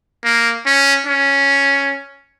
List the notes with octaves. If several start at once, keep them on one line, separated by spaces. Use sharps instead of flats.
A#3
C#4
C#4